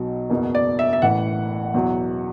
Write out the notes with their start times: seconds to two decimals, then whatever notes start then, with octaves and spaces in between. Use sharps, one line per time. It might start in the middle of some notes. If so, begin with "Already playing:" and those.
Already playing: B1 B2 F#3
0.30 F#1 E2 B2
0.55 D5
0.79 E5
0.93 E5
1.02 A1 A2 E3 F#5
1.74 E2 B2 F#3